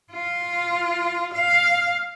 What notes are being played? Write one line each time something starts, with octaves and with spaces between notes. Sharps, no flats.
F4
F5